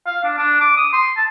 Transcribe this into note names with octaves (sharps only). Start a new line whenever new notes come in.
F5
D4
D4
D6
D#6
C6
A5